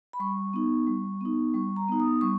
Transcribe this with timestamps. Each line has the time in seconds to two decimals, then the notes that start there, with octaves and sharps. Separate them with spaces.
0.13 B5
0.20 G3 C#6
0.53 B3 D#4
0.87 G3
1.21 B3 D#4
1.54 G3 C#6
1.76 A#5
1.88 B3 D#4
2.00 D#6
2.21 G3 C#6